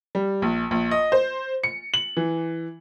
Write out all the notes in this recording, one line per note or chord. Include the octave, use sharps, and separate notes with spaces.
G3
A#1
A#1
D#5
C5
C#7
F#7
E3